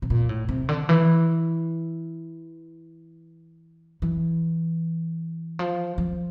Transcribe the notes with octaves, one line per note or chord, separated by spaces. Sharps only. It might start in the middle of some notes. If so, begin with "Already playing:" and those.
C3
A#2
A2
C3
D3
E3
E3
F3
F3